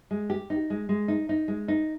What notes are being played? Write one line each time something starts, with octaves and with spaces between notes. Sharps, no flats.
G#3
G4
D#4
G#3
G#3
D#4
D#4
G#3
D#4